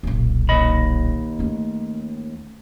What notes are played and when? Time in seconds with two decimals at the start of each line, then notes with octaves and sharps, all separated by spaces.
0.03 D#1 B1
0.49 D#2 D#5 B5
1.39 A3 C#4